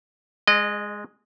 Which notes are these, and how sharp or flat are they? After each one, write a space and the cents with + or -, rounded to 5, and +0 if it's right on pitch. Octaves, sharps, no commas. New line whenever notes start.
G#3 +0 D#5 -30